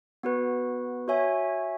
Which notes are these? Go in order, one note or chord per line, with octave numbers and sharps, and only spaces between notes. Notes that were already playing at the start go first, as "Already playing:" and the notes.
B3 F#4 B4
F#4 C#5 E5 G#5